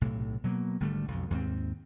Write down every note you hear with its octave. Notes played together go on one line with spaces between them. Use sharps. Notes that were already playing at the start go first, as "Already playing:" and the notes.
B1 A2 C3
B2 F#3 G#3 A#3
G#1 D3 G3 A3
B1 F2
D#2 G#2 A#3 C4